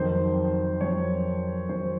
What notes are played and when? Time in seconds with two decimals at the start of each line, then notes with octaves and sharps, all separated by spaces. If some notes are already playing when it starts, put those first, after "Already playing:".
Already playing: F2 D#3 F#3 C5
0.81 F2 D#3 F#3 C#5
1.69 F2 D#3 F#3 C5